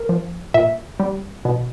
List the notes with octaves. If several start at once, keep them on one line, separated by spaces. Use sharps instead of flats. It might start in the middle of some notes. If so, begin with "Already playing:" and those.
Already playing: A#4
F3
A#2 E5
G3
B2